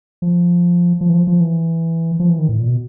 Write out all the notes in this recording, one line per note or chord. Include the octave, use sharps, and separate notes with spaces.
F3
F3
E3
F3
F3
E3
F3
E3
D#3
A2
A#2
B2